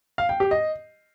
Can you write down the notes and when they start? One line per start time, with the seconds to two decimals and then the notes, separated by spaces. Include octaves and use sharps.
0.18 F5
0.29 G5
0.40 G4
0.51 D#5